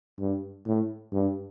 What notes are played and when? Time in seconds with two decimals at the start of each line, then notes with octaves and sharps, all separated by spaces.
0.19 G2
0.66 A2
1.13 G2